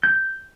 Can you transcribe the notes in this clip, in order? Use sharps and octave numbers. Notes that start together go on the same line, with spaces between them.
G6